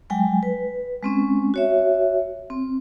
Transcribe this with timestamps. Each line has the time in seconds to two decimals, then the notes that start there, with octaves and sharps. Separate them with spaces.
0.10 F#3 G#3 G5 G#5
0.43 B4
1.03 G#3 C4 C#4
1.54 F#4 C#5 E5
2.50 C4